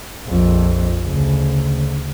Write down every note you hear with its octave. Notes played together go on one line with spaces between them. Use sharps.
A#1 F2
D2 C#3